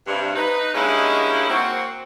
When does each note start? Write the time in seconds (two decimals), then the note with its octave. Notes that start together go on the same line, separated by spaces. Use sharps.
0.07 G2 C3
0.35 D#4 B4
0.73 G2 G#3 A#3 C#4 D#4 E4
1.48 A#3 C4 F#4